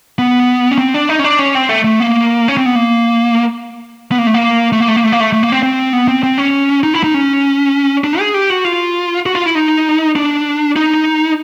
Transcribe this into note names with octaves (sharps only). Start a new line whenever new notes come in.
B3
C#4
C4
D4
D#4
C#4
D4
C#4
C4
A3
A3
A#3
C#4
C4
B3
A#3
B3
A#3
A3
A#3
A3
A#3
A3
A#3
A3
A#3
A3
A3
A#3
C4
C4
B3
C4
C4
C#4
D#4
E4
D#4
C#4
D4
G#4
G4
F#4
F4
F#4
F4
E4
D#4
D4
D#4